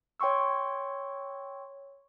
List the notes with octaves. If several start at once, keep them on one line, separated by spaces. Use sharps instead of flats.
C#5 G5 C6 C#6 E6